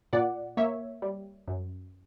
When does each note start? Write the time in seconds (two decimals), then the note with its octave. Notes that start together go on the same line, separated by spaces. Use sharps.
0.13 A#2 D5 F#5
0.57 A#3 C#5 E5
1.02 G3
1.48 F#2